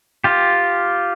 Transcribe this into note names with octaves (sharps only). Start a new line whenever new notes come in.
F4 G4